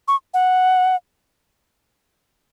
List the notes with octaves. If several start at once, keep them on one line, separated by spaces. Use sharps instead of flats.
C#6
F#5